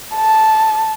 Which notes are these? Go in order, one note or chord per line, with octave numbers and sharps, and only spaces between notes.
A5